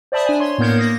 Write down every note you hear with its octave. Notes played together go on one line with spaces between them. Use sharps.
C5 D5 E5 A5 B5 D#6
D4 G#5
C#5 C6
A2 A#3 B3 A#4 G6 G#6
A#3 D#6 A#6